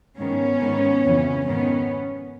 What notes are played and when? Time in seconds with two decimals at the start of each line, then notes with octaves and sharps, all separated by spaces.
0.17 G#2 D#3 B3 C#4
0.60 G#2 D#3
1.04 F2 C#3 E3
1.47 G#2 D#3 B3 C#4